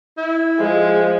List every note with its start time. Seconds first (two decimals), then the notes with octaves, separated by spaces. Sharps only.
0.17 E4
0.60 F3 G#3